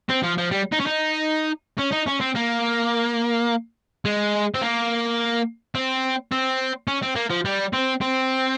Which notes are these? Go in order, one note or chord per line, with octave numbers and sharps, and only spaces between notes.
C4
F3
F3
G3
D#4
C#4
D#4
C#4
D#4
C#4
C4
A#3
G#3
C4
A#3
C4
C4
C#4
C4
A#3
F3
G3
C4
C4